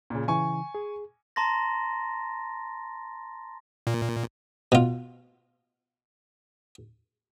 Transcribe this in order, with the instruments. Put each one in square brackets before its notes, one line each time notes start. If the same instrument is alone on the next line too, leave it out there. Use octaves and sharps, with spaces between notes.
[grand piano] A#2 C#3
[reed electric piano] C#3 E3 [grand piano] G#5 C#6
[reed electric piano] G#4
[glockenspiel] A5 A#5 C6 A6 A#6
[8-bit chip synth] A#2
[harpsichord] B2 F4